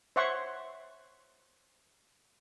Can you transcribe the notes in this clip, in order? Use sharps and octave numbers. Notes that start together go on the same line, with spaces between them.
C5 C#5 E5 F#5 C6 C#6